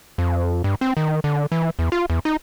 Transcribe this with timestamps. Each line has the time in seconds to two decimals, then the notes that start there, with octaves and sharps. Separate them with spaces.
0.18 F2
0.64 G2
0.81 C4
0.97 D#3
1.24 D3
1.52 E3
1.79 E2
1.92 F4
2.10 E2
2.25 D#4